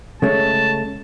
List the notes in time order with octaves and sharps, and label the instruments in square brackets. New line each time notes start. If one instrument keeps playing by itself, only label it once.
[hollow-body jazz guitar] C#3 G#3 A3 [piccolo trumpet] A5